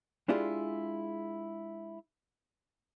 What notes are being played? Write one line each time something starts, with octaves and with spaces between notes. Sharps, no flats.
G#3 D4 E4 F4 G4 G#4